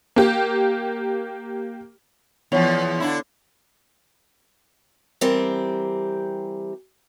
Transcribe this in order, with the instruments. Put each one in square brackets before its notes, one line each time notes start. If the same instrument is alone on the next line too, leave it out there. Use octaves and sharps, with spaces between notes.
[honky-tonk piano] A#3 G4
[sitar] E2 F3 [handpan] B3 C#5
[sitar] D3 D4 E4
[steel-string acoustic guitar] E3 G3 C4 G4 A#4